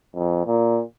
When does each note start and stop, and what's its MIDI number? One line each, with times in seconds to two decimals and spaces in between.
0.15 0.45 41
0.46 0.82 46